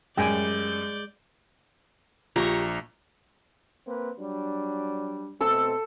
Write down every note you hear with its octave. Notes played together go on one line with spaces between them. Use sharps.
F#2 G3 G#3 D5 G5 G#5 G6
A#1 F4 G4 A#5 C#6
A#3 C4 B4
F#3 G3 D4
B2 A3 C4 A4 E6